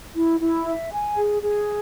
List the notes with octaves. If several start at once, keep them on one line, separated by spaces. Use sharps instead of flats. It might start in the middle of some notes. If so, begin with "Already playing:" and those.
E4
E4
E5
G#5
G#4
G#4